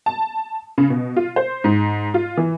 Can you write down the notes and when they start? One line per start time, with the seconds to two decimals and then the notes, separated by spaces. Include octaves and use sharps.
0.06 A5
0.78 C#3
0.90 B2
1.16 F4
1.36 C5
1.64 G#2
2.14 F4
2.37 E3